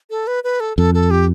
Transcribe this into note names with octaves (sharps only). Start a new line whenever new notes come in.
A4
B4
B4
A4
F2 A4
A4
G4